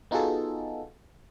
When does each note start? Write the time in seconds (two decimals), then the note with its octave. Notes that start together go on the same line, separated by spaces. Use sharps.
0.11 B3 D#4 F4 F#4 G#4 A4